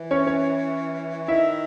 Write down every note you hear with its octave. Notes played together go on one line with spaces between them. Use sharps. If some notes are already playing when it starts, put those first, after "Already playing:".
Already playing: E3
C#4 C#5
C#4 C#5
D#3 E4 E5